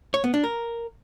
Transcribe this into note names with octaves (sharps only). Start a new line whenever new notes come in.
C#5
B3
D4
A#4